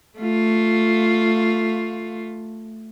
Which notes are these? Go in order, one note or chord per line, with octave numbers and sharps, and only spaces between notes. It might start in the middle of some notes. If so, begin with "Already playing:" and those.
A3 F4